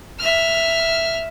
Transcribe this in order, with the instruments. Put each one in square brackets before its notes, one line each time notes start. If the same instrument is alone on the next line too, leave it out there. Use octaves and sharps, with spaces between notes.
[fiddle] E5 F6